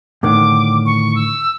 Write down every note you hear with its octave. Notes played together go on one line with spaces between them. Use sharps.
A2 D3 D#3 D6
C#6
E6